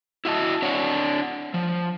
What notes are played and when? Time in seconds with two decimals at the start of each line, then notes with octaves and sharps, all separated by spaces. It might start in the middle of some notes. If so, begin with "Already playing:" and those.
0.25 E4 F#4 D#5 A5
0.62 D4 C#5 F#5
1.54 F3